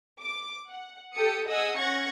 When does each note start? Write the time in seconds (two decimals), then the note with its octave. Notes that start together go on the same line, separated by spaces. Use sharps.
0.20 D6
0.68 F#5
1.14 G4 A4 G5 D#6 C#7
1.48 G#4 D#5 F#5 G#5 D#6 E6
1.78 C#4 F#5 C#6 G#6 A#6 C#7